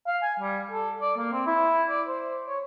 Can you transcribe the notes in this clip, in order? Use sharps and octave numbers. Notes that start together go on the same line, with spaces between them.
F5
G#5
G3
A4
D5
A#3
C4
E4
D5
C5
C#5